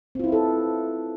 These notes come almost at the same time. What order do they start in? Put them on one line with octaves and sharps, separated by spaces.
C4 F4 E4 B4 A4